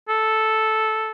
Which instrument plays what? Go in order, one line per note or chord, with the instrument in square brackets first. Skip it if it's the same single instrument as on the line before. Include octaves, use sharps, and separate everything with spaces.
[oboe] A4